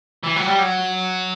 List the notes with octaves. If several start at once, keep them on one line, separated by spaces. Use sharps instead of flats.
E3
F#3
G3
F#3